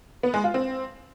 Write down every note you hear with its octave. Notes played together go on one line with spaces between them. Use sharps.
B3
G#3
F4
C4